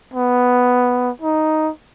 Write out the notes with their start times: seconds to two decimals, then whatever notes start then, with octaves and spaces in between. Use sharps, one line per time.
0.13 B3
1.22 D#4